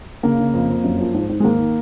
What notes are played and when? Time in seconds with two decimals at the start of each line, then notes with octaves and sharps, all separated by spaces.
0.23 C#3 A#3
0.39 C#3
0.54 F2
0.69 F2
0.84 F#2
0.99 F3
1.14 G#2
1.29 G#2
1.40 G#3
1.44 D#3 A#3